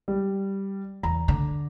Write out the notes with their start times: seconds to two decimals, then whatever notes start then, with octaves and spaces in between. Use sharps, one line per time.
0.08 G3
1.03 E2 A#5
1.28 D3